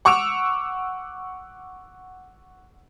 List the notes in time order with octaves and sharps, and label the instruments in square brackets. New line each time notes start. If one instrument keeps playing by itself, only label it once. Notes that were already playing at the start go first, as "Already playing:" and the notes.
[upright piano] F#5 C#6 D6 E6 D7 F7